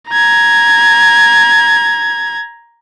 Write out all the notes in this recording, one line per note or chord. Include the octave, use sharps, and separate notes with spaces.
A#5 G#6